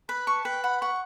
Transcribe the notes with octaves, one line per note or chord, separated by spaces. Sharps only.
B4 B5
A5 C#6
B4 G5
F#5 B5
F#5 C#6